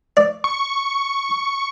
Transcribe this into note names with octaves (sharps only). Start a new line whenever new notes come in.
D5
C#6